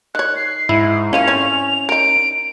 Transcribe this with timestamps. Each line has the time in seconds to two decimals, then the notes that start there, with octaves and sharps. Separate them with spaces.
0.15 D#3 C#5 F#6
0.36 C7
0.69 G#2 E4
1.13 D#3 A#3 C#4 F4 F7
1.27 C4 A4 C#5
1.89 D#4 A#4 D7